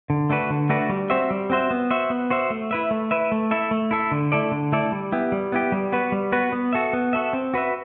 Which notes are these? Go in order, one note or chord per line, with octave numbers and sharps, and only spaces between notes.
D3
A3 D4 F#4 B4
D3
A3 D4 F#4 B4
G3
C4 F#4 C5 E5
G3
C4 F#4 C5 E5
B3
F#4 C5 E5
B3
F#4 C5 E5
A3
E4 B4 E5
A3
E4 B4 E5
A3
E4 A4 E5
A3
E4 A4 E5
D3
A3 E4 A4 D5
D3
A3 E4 A4 D5
G3
B3 E4 G4
G3
B3 E4 G4
G3
B3 F#4 B4
G3
B3 F#4 B4
B3
F#4 A4 E5
B3
F#4 A4 E5
C4
F#4 B4 E5